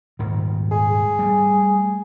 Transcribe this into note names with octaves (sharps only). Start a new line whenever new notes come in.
D#1 G#2 D#3
G#4
G3 A3